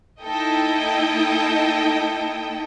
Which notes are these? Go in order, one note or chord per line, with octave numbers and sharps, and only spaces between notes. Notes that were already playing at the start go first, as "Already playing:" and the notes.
A#3 D#4 E4 A4 D#5 G5